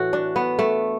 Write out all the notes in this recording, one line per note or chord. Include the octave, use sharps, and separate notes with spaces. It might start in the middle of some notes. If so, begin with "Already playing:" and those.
Already playing: A2 E3 F#4 A4
D4
B3
A3